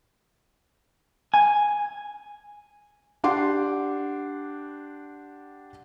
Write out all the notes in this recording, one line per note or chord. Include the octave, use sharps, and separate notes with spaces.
G#5
D4 G4 F#5 C6 D6